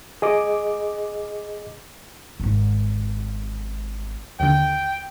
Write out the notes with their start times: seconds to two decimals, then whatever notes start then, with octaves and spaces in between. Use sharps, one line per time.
0.22 G#4 D#5 D6
2.40 D#1 G#1
4.40 D#2 D3 G5